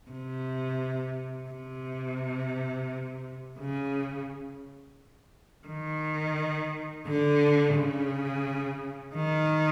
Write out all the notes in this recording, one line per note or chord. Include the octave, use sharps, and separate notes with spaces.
C3
C3
C#3
D#3
D3
C#3
D#3